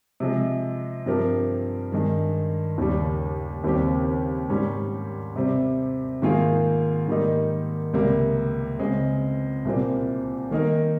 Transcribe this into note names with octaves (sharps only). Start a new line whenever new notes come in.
C3 F3 G#3
G2 F3 C4 G4 A#4
G2 D#3 G#3
D#2 C#3 G3
D#2 C#3 G3 C4 G4
G#2 G3 C#4
C3 G3 C4
G#2 D#3 A#3 F4 G#4
G#2 D#3 G3 A#3 D#4
C#2 C3 G3 A#3
C#2 C#3 G#3 C4
C2 A#2 G3 C4
D#3 A#3 D#4 A#4